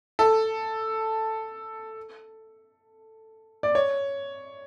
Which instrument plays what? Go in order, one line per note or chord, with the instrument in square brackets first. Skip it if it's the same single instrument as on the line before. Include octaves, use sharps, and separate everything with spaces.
[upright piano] A4
D5
C#5